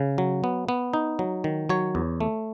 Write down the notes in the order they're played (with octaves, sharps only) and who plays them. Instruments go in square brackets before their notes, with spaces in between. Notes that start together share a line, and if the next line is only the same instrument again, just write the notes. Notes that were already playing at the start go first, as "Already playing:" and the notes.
Already playing: [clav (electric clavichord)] C#3
F#3
B3
B3
D#4
F#3
D#3
F#3 C#5
E2
A3